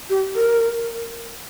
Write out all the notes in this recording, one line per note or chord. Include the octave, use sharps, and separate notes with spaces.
G4
A#4